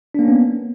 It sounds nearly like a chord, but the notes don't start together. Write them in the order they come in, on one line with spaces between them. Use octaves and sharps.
D4 A#3 C#4 B3